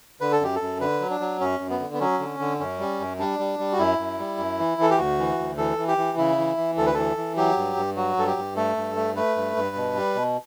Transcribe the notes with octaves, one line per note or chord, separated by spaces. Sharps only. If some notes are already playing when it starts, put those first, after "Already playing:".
D3 B4
A4
F#2 G4
A4
F#2
D3 B4
F#3
D4
F#3
F#2 C#4
F#2
B3
D3
B3
F#3 C#4
D3
D3
F#2 C#4
G3
F#2
G3 D4
G3
G3
F#4
F#2 E4
F#2
G3
F#2
E3
E3 A4
G4
D2 F#4
E3
D2
E3 A4
E3
G4
E3
C#3 E4
E3
E3
D2 A4
B4
E3 A4
E3
F#3 G4
G2
G2
F#3 F#4
G2 A4
G4
G2
A3 A4
G2
A3
A3 B4
G2
G2
B2
G3
B2